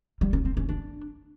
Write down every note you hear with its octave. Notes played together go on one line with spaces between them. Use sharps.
G3
C#4
C4
C#4
D4